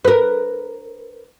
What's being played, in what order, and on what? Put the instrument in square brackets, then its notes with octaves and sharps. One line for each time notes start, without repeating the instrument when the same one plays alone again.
[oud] A#4 B4